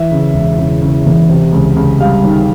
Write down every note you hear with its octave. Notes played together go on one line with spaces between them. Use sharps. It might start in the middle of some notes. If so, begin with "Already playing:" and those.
Already playing: E3 E5
C#3
E1
C#3
C#3
E2
C3
C#2
C#2
G3 F5
D#3